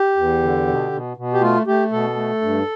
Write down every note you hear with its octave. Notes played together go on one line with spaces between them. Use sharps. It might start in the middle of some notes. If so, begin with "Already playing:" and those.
Already playing: G4
E2
D3
B2
B2
B2
G4
A3 F4
A3 G4
B2 A4
A3
G2